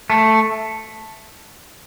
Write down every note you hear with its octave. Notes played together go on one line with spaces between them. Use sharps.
A3